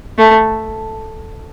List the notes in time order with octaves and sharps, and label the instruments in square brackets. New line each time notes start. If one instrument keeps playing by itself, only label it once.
[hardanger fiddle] A3